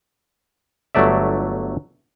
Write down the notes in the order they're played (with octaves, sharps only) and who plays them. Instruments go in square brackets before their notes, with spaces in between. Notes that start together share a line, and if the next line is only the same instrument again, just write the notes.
[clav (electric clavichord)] G1 F#3 A3 D5 E5